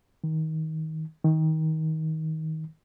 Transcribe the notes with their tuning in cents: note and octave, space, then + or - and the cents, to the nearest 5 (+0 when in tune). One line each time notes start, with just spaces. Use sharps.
D#3 +25
D#3 +25